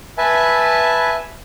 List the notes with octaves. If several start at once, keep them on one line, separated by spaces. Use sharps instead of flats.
B4 E5 G#5 A5